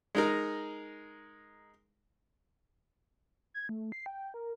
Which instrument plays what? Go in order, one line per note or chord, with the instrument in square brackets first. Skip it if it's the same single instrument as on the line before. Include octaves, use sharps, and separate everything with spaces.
[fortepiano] G#3 D#4 A#4
[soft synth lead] G#6
A3
C7
G5
A#4